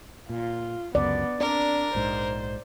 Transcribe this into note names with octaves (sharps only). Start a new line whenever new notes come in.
A#2 F4
C#2 F#2 D3 B3 D5
C4 D4 A#4 D5
A#1 G#2 C5